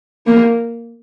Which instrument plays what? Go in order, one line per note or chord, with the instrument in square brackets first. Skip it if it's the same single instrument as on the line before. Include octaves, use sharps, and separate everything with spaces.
[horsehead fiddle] A#3